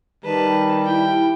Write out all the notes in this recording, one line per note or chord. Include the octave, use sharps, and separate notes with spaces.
D#3 G3 B4 A5
E4 G5